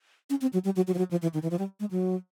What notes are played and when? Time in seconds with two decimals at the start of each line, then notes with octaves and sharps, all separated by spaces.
0.30 C#4
0.41 C4
0.53 F#3
0.65 G3
0.76 F#3
0.87 F#3
0.94 F3
0.98 F#3
1.11 F3
1.22 E3
1.34 D#3
1.43 E3
1.51 F3
1.59 G3
1.80 G#3
1.91 F#3